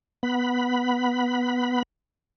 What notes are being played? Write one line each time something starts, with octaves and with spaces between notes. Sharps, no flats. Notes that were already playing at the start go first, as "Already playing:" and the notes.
B3 B5